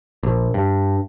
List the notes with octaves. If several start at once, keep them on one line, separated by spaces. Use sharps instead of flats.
A#1
G2